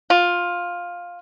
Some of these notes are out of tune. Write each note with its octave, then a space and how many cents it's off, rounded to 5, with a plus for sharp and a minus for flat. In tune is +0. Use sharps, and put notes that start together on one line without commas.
F4 +10